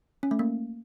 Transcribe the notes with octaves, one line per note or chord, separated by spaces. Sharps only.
C#4
A3
A#3